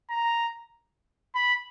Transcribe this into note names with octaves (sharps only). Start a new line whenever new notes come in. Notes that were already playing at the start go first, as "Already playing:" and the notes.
A#5
B5